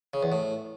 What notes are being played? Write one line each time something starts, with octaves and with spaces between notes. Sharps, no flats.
C#3
E2
A2